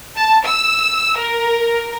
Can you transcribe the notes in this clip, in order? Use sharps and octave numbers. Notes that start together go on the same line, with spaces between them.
A5
E6
A#4